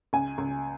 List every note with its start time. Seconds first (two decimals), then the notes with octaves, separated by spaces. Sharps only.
0.13 C#2 G#5
0.38 C#2